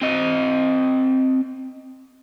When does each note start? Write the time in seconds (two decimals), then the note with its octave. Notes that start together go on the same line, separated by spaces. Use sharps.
0.02 C4 D#5